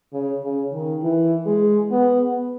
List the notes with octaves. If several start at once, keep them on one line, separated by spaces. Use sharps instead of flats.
C#3
C#3
D#3
E3
G#3
B3